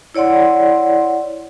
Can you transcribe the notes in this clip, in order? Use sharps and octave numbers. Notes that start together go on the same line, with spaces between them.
E4 C#5 D5 F#5 C6